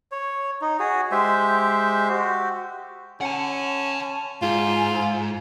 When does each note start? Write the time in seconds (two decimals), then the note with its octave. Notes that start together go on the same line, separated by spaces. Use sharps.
0.12 C#5
0.62 D#4
0.80 F#4 G#4
1.12 G#3 G4 C5 E5
2.09 F#4 G4
3.21 C#4 F#5 A5
4.42 G#2 F4